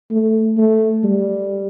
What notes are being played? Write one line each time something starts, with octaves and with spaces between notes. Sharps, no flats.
A3
A3
G3